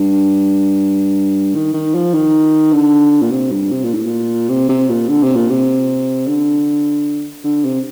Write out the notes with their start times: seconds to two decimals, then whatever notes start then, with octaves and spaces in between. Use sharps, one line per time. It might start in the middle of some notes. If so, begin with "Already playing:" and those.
Already playing: G2
1.55 D#3
1.74 D#3
1.94 F3
2.14 D#3
2.72 D3
3.22 A#2
3.31 C3
3.52 G2
3.71 C3
3.83 A#2
3.94 A2
4.06 A#2
4.49 C3
4.69 C3
4.89 A#2
5.09 D3
5.23 C3
5.35 A#2
5.50 C3
6.27 D3
7.44 D3
7.64 C3